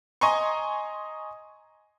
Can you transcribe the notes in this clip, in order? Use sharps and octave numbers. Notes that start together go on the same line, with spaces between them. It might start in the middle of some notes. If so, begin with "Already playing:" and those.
D#5 G#5 A#5 C6 C#6